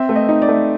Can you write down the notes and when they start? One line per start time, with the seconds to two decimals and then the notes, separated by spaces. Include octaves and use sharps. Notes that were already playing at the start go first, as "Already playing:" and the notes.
Already playing: C4 E5
0.09 A3
0.16 D#5
0.29 D#4
0.42 D5
0.48 A3